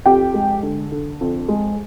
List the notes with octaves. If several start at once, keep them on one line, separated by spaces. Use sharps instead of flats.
F2 G4 G5
G#3
D3
D3
F2
G#3